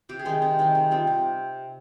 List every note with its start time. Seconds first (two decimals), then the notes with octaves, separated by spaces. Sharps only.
0.09 C3 G4
0.19 G#4
0.25 D#3 G#3 D#4 G4
0.42 C3
0.59 D#3 G#3 D#4
0.75 C3
0.91 G3 C4 F4
1.07 C3